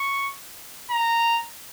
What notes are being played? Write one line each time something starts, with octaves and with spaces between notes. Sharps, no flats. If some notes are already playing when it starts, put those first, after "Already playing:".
Already playing: C#6
A#5